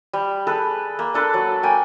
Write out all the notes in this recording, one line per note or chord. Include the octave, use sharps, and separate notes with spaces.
G3
G#4 A4 B4
A#3
D4 A4 B4
F#3
A#3 G5 G#5